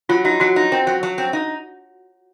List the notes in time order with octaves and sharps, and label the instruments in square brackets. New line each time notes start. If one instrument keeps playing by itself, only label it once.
[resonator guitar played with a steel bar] F#3 [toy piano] F4
[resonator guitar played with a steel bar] D#4 [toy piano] F#4
[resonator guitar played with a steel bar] F#3 [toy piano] F#4
[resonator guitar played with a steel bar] D#4
C4
F#3
F#3
C4
D#4